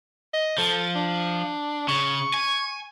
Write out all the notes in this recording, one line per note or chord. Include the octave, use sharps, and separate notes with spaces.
D#5
F3 A4
D4
C#3 C#6
G#5